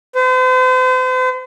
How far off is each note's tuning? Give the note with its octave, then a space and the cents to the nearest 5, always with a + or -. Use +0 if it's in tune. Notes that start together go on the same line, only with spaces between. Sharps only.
C5 -40